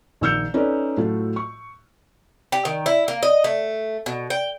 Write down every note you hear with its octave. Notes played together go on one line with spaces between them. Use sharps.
A#1 D#3 E6 F6 G6 C#7
C#4 D#4 A4 B4 D5
A2 F#3 A3 F4 F#4
C#6
G4
D#3
E4
A#3
D#5
A3
B2
G5